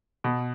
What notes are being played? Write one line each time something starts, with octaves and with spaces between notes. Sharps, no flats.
B2